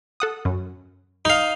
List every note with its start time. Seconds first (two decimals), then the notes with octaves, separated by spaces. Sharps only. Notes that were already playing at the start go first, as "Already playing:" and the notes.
0.20 A4 F#5 D#6
0.45 F#2
1.25 D#4 F5